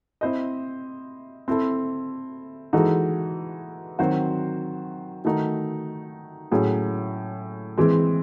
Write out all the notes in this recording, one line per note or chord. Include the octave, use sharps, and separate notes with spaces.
C4 E4 C5 D#5
C4 E4 A4
E3 G#3 D#4 F#4 A4
D#3 F#3 C4 F#4 C5
D#3 A3 D#4 F#4
A2 F#3 C#4 G#4
E3 G#3 C4